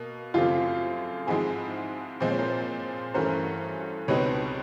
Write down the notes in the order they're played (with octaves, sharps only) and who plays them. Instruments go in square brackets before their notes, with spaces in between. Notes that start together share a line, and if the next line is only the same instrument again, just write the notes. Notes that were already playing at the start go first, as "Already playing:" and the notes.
Already playing: [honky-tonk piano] B2 A#3
[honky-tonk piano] F#2 C#3 F3 A3 C4 [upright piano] F4 G4
[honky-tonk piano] G#2 F3 G#3 C4 E4 [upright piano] F#4 G#4
[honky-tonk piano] A#2 F3 G#3 C4 [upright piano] C5
[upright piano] C#5
A#4 C5
[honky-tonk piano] G2 E3 A3 C#4 F#4 [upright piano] A#4 C5
[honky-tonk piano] C#2 B2 G3 C4 D#4 [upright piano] B4 C#5